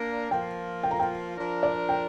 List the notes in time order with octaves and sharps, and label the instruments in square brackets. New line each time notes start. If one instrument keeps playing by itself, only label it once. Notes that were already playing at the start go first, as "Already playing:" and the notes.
Already playing: [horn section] A#3 D4 A#4
[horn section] F3 A#3 F4 [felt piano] G5
[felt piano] G5
A#5
G5
[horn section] F3 D4 A#4
[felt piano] D5
G5